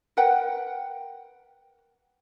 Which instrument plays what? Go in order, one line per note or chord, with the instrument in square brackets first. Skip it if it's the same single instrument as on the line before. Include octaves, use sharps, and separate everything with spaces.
[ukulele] A#4 B4 F#5 G5